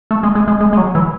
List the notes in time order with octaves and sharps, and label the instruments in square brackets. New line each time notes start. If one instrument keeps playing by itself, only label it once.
[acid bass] A3
G#3
G#3
G#3
G#3
G#3
F#3
E3